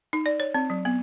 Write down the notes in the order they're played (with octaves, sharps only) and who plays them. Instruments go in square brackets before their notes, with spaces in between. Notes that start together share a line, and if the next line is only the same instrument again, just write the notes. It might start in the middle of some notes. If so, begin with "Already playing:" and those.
[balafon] D#4
D5
C#5
C4
F#3
B3